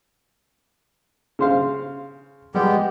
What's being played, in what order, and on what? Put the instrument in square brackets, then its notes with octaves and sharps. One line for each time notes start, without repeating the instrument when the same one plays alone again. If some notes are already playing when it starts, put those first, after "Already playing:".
[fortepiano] C#3 C5 F5
[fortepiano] G3 [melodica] G#3 B3 G4